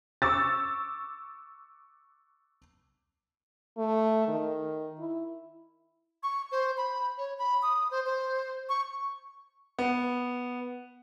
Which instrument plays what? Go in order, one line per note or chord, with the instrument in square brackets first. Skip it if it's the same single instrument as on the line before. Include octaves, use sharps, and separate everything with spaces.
[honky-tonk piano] C#6 D6 E6 A6
[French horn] A3
D#3
E4
[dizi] C#6
C5
B5
C#5
B5
D#6
C5
C5
C#6
[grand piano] B3